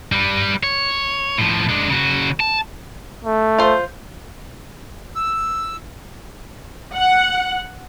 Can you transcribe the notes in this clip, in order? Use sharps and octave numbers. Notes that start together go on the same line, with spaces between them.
G3 B4
C#5
A2 F3
G#3 D4
C#3 F#4
A5
A3
F4 C5
E6
F#5